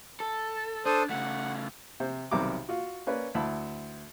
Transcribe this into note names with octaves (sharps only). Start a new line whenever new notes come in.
A4
D4 A4 C5 D#6
C#3 A3 F#5
C3 C5
B1 C3 D#3 G3 A#5 D6
F4 F#4
A#3 C#4 B4 D5
D2 E4 A5 B5